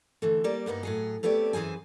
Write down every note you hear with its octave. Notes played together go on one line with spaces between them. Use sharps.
D3 E3 A3
G3 A#3 D5
G2 A#3 B3 D#4
A2 F#3 G#4
A3 B3 C4 G4 C#5 D5
F#2 E3 G#4 C5 G#5